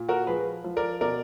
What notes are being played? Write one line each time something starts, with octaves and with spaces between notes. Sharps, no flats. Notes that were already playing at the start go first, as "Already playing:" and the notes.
Already playing: A#2
F#4 A#4
F3 G#4 B4
F3
A#4 D5
B2 A#4 D5